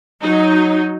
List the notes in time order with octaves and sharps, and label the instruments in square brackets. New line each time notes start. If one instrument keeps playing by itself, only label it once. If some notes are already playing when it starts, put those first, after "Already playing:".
[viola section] F#3 D#4